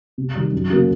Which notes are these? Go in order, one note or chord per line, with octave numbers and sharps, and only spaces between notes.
C3
D#3 G3
F#2
C#3 F#3 A#3 C#4